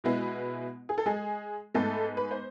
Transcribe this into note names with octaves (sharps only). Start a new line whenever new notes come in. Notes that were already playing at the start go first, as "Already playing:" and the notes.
B2 G#3 B3 E4
G#4
A4
G#3 G#4
G#2 G#3 A3 B3 A4
B4
C5